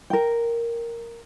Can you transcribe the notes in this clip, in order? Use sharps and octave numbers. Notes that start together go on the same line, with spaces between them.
A#4 G5